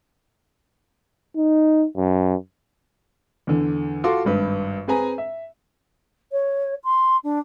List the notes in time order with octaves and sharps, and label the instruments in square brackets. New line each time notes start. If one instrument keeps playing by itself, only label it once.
[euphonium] D#4
F#2
[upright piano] E2 D3
F4 F#4 A4 F5 C6 D6
G#1 G2 B4
C4 G#4 B4 G#5 A#5
E5
[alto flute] C#5
C6
D4